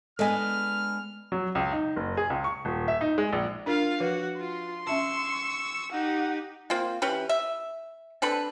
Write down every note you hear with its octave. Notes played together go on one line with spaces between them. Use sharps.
G#3 B3 D4 A4 D#5 G#5 F6
F#3
C#2
D#4
F#1
G#4
C#2
C#6
D#1
E5
D#4
G#3
A#1
D4 F4 A#4 F5
F3 F#4 B4
F4 C6
C#4 E5 A5 C#6 E6
D#4 G4 F#5
A#3 C4 F4
E3 C#4 G4 B4
E5
C4 D4 A4 B4